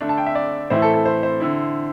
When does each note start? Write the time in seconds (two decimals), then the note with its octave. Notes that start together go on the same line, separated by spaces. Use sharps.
0.01 D3 A3 D4
0.09 A5
0.18 G5
0.26 E5
0.35 D5
0.70 A2 E3 A3 E4 C5
0.82 A4
0.94 A4
1.05 C5
1.23 C5
1.40 D3 C4 E4